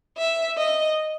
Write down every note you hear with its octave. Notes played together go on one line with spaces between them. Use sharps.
E5
D#5